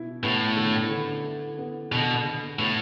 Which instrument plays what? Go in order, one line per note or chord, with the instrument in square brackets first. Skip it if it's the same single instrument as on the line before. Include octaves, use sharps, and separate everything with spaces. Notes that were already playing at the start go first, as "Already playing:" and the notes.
Already playing: [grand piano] B2 E4
[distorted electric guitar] A2 [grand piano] B3
[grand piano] D3
D3
E4
B3
[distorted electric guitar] B2 [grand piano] D3
[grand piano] D3
[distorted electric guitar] A2 [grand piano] B3